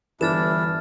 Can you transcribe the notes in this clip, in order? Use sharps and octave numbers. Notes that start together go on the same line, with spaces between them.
G1 E3 D4 E4 F6 A6 E7